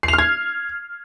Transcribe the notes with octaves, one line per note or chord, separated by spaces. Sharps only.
C7
F7
F6
G#6